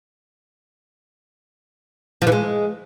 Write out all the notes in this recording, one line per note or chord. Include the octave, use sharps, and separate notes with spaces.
F3
E3
G#3